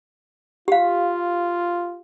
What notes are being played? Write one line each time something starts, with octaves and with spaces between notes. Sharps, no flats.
F4 G4 F5